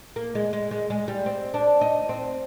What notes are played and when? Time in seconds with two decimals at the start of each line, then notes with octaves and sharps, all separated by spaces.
0.16 A#3
0.35 G#3
0.53 G#3
0.71 G#3
0.90 G#3
1.08 G3
1.26 C4
1.54 D4
1.81 D#4
2.09 C4